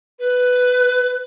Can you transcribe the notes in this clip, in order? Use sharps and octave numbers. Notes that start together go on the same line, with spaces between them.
B4